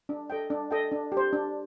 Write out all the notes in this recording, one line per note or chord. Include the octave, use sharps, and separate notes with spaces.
D4
A4 D#5 G5
D4
A4 D#5 G5
D4
G4
C5
D4